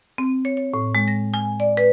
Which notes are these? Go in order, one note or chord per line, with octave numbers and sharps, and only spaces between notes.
C4
C#5
C#5
A2
G#3
A#6
G#5
D5
B4